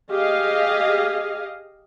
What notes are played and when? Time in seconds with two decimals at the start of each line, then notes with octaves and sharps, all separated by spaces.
0.11 G4 G#4 D#5 F5